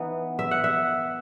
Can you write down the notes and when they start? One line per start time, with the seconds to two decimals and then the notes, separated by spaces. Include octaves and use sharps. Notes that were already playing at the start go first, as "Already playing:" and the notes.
Already playing: E3 B3 D#4
0.39 E5
0.51 F#5
0.64 E5